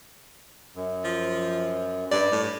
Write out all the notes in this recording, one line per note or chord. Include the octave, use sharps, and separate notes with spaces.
F#2
F3
G2 D5 D6
A2